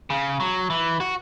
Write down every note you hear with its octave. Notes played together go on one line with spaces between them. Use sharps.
C#3
F#3
E3
F#4